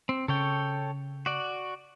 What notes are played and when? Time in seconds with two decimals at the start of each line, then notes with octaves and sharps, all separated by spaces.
0.09 C4
0.28 C#3 A4 C#5 G5
1.26 F#4 D5